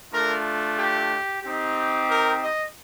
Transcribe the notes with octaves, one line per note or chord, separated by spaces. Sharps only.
A3 D4 F4 A#4
G4
C4 D#4 G4
A#4
D#5